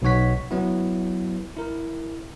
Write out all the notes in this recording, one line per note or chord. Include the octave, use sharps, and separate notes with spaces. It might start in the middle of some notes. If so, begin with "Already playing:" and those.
B1 B2 D#4 C#5 F#5 B6
F#3 B3 E4
E4 A#4